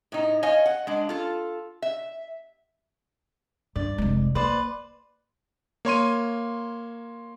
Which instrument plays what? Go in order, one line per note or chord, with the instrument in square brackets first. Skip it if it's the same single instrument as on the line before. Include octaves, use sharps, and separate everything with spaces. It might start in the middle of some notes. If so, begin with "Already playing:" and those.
[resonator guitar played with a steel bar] A2 D#4
C#5 D#5 F5 G#5
F#5
G#3 D4
F4 A4
E5
[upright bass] G2 [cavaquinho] D5
[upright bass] F1 G#3
[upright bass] A#3 [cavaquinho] B4 C5 D5
[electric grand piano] A#3 C#5 C6 D#7